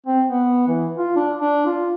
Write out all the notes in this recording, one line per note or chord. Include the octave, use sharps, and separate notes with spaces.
C4
B3
E3
F4
D4
D4
F4